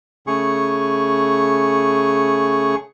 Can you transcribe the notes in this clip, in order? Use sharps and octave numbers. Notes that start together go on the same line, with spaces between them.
C#3 A3 G#4 C#6